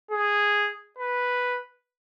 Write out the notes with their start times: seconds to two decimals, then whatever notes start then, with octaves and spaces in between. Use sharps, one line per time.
0.11 G#4
0.98 B4